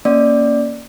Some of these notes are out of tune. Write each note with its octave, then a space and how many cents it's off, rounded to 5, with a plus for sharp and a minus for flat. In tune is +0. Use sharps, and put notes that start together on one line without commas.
A#3 +0 C#4 +0 D5 +0